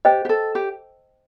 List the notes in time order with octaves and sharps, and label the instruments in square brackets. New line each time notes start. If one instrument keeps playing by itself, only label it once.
[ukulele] G4 [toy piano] C5 D#5 G5
[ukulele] G4
A4
G4